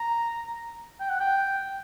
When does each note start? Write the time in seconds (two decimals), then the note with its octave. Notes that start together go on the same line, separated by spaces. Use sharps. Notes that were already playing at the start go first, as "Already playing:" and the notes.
Already playing: A#5
1.00 G5
1.10 F#5
1.20 G5